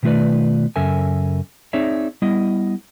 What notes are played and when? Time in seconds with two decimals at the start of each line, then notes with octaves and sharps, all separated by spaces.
0.03 B2 D#3 A3 F4 B4 D5
0.76 F#2 C#3 A4 A#4 E5 G#5
1.73 C4 D#4 G#4 C#5 D5 E5
2.22 G3 B3 E4 D#5